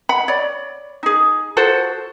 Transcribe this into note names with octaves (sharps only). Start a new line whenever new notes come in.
F#5 B5
C#5 D5
D#4 G#4
F4 F#4 A4 C5